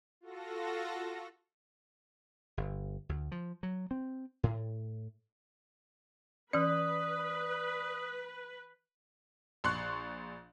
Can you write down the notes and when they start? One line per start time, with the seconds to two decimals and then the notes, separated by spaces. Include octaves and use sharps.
0.21 F4 F#4 A4 A#6
2.57 G1
3.09 D2
3.32 F3
3.63 F#3
3.91 C4
4.43 A2
6.53 E3 C#4 B4 D5 D#6
9.64 A#1 C6 C#6 F#6